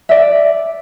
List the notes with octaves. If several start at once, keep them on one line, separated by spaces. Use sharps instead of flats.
D5 E5